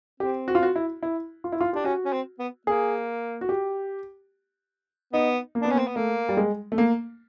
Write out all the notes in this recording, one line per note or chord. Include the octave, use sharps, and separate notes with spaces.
C4 G4
F#4
F4
F#4
E4
E4
F4
E4
F4
D4 G4
C#4 F#4
C#4
C4
B3
A#3 G#4
F#4
G4
B3 D#4
A#3
B3 D4
A#3 C#4
C4
B3
A3 A#3
G3
G#3
A3
A#3